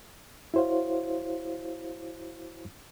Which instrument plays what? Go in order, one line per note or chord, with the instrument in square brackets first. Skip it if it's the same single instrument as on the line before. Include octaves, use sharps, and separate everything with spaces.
[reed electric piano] E4 F#4 C5 C#5 F5